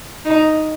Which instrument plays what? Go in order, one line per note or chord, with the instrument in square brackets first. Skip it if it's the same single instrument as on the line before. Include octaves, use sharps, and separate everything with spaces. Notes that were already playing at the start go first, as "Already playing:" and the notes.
[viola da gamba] D#4